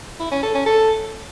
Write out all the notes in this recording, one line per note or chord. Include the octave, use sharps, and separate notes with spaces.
E4
C#4
A4
C#4
A4